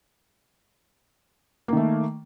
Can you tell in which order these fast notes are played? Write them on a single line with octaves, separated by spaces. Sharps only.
A#3 D#3 A3